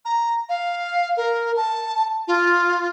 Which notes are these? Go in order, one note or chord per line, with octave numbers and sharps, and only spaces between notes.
A#5
F5
A#4
A5
F4